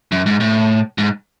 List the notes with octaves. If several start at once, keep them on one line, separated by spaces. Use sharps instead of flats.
F#2
G#2
A2
G#2